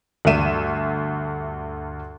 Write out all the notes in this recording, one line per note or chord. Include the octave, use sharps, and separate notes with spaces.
D2 G2 G3 E5 D#7 E7